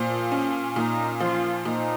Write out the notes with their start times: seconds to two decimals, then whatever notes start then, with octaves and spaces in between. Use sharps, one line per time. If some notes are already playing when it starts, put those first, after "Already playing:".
Already playing: A#2 F3
0.32 C#4
0.76 A#2 D#4
1.20 F3 F4
1.64 A#2 D#4